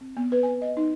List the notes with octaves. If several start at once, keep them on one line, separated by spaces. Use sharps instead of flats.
C4
B3
B4
G#5
D#5
D#4